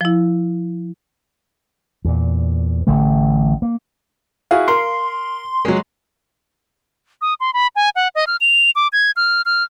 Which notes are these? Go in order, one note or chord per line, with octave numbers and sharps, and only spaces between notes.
F3 E4
E2 A#2
A1 D3 E3 A3
A#3
E4 F#4 G#4 F5
A#4 C6
F#3 G#3
D#6
C6
B5
G#5
F#5
D#5
F6
F7
D6
G#6
F6
F6